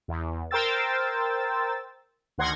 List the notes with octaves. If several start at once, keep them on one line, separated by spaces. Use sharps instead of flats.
E2
A#4 C5 G5 E6 A6
D2 D#3 F#5 C6 G#6 A#6